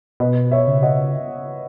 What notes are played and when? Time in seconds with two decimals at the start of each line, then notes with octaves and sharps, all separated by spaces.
0.20 B2 B4 D#5
0.51 C#5 E5
0.67 C#3
0.83 D#5 F#5